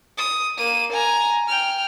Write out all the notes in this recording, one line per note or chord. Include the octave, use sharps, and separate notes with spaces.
D#6
A#3 D#7
G#5 A#5
G5 F6